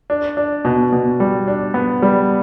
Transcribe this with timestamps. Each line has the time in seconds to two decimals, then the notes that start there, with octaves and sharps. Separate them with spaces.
0.10 D4
0.37 D4
0.65 B2
0.93 B2
1.20 G3
1.48 D4
1.74 B3
2.02 G3